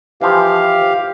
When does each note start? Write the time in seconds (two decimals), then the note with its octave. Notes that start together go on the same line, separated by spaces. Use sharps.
0.21 E3 F3 G4 F5